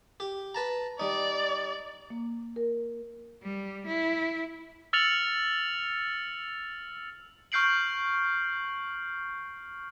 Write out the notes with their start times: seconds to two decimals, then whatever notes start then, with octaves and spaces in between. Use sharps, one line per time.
0.20 G4
0.55 B4 A5 A#5
0.99 G3 D#4 D5
2.10 A#3
2.56 A#4
3.43 G3
3.87 E4
4.93 E6 F6 A6 C#7 F7 F#7
7.52 C#6 F6 G6 C7 D7 F#7